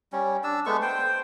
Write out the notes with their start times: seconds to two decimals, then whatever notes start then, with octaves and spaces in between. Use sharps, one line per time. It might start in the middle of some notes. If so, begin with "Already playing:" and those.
0.13 G3 C#4
0.44 D4 E6
0.66 G#3 A3 B3 C#6
0.82 C5 G5